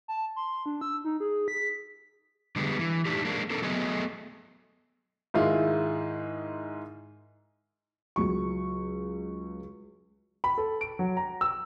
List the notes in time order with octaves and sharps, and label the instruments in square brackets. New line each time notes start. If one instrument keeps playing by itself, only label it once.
[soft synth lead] A5
C6
D4
E6
D#4
G#4
B6
[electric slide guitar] D3 G3 G#3 B3
E3
A3 D4 D#4 G4
G#3 A#3 D4
C4 D#4 A4 A#4
F#3 A3 B3 G#4 A4 D#5
[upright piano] G#2 D#3 G#3 E4 F4
[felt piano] C#2 F#3 C#6
[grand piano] B5
A4
D7
F#3
A#5
E6